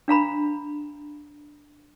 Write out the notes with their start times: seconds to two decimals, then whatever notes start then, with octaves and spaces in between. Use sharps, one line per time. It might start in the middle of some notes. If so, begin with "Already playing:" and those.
0.08 D4 F5 A#5 B5